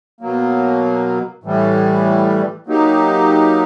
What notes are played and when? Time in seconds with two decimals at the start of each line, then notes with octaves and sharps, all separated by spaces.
0.21 B2 F#3 A#3
1.44 A2 E3 G3
2.67 F#3 A#3 D#4 G4